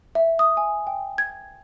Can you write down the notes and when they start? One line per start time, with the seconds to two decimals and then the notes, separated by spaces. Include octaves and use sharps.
0.15 E5
0.39 D#6
0.57 G#5
0.87 G5
1.18 G#6